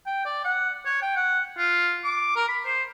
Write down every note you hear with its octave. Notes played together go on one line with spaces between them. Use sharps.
G5
D5
F#5
C#5
G5
F#5
F4
D6
A#4
B5
C5